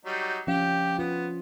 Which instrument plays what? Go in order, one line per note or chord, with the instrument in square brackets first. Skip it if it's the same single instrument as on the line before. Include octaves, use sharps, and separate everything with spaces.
[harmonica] F#3 G3 D#4
[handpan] F3 C#4 F5 [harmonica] G4
[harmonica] B3 [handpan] F4